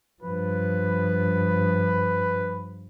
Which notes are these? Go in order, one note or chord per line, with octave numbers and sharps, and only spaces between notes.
G2 F3 B4